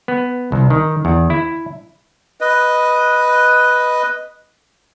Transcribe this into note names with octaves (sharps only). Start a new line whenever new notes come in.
B3
C2
D#3
E2
E4
B4 D#5